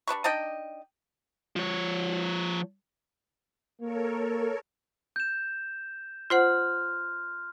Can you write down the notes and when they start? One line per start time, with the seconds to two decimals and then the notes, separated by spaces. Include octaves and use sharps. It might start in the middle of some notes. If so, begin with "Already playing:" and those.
0.08 G3 D4 B4 C#6
0.24 D4 D#4 D#5 G5
1.56 F3 C#5
3.80 A#3 A4 A#4 C#5
5.16 G6 E7
6.30 F4 C5 F#5 C6 F6